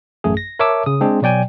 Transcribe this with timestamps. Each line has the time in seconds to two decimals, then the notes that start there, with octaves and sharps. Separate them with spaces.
0.24 A1 F#2 A3 G#4
0.37 A#6
0.59 A#4 C#5 E5 A5 D6 E6
0.86 C#3 D#6
1.01 G#3 C4 D4 G#4
1.22 B2 F#3 D5 G5 G#5